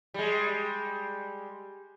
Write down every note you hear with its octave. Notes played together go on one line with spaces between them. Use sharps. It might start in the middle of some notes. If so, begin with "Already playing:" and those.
G3 G#3